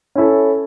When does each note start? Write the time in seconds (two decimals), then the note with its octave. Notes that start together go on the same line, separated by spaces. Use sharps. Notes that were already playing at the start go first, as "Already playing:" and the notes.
0.15 C#4 E4 A4